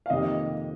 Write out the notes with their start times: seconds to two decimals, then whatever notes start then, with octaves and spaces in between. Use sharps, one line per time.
0.06 F5
0.10 F2 C3 D#3 A#3 D#5